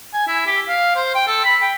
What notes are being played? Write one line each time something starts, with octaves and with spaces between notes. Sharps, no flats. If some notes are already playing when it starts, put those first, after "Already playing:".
G#5
E4
G4
F5
C5
G5
A4
B5
G5